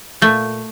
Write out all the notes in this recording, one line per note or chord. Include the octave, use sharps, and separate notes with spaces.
A#2 A3